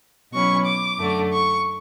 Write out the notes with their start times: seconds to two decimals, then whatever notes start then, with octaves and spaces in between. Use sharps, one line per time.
0.32 B2 F#3 C#4 E4 C#6
0.65 D6
0.98 F#2 D3 A3
1.32 C#6